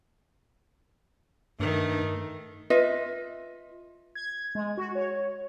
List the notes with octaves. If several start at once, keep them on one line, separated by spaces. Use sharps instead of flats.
G2 D#3 A3
F4 B4 D#5 E5
G#6
G#3
F#4
C#5